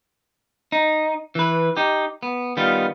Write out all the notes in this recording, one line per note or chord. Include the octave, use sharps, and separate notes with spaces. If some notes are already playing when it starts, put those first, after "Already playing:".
D#4
E3 B4
D#4 G4
B3
D#3 G3 B3 F4